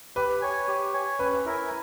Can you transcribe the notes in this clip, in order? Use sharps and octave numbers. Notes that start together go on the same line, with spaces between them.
G4 B4
C#5 G#5
G4
C#5 G#5
C#4 B4
E4 A#4 E5 G#5